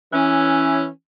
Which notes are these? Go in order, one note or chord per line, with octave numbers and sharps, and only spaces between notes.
E3 C#4